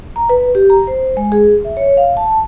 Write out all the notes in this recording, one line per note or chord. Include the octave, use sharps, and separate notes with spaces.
A#5
B4
G4
A#5
C5
G#3
G#4
E5
C#5
F5
A5